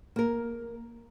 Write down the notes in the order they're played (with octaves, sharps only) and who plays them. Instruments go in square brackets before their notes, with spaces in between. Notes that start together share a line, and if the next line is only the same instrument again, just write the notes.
[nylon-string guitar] A#3 A#4